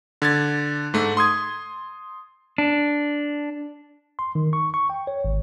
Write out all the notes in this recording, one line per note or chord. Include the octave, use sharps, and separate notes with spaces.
D3 G#6 A6
G#2 A3
C6 D#6 G#6
D4
C6
D#3
C#6
C#6
G5
C#5
G#1